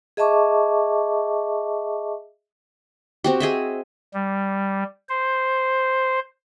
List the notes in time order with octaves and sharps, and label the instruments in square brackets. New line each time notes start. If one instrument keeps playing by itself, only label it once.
[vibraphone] G#4 D#5 E5 A5 C#6 D6
[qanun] C4 F#4 G4
G#4 D#5 E5
[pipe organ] G3
C5